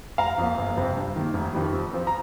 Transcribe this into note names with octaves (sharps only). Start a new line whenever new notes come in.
F1 F5 A#5
F2 F3 A#3
G1
F2 C3 G3 C4
G2
D#3 A#3
F1
F2 D#3 G3
F2
F3 C4
A#5